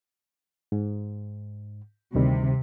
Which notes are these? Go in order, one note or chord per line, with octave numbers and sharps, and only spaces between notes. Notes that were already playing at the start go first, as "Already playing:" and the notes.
G#2
D2 C3 D#3 G3